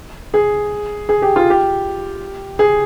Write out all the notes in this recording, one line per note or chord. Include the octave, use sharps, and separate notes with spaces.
G#4
G#4
G4
F4
G4
G#4